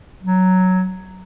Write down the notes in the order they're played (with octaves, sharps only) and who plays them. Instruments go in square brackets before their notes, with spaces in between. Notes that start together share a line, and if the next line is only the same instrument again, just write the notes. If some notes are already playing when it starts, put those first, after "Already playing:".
[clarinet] F#3